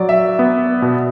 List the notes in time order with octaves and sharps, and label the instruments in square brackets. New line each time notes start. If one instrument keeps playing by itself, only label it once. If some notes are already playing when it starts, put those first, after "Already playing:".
Already playing: [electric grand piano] F#3 [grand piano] D5
[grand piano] E5
[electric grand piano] B3
B2